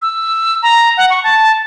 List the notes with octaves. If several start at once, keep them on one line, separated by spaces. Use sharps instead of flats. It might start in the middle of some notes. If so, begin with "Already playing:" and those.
E6
A#5
F#5
C#6
A5